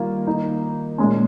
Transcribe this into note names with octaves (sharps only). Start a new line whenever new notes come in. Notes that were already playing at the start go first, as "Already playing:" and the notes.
Already playing: D#3 G3 A#3 F4
D#3 A#3 D#4
A#2 G#3 C#4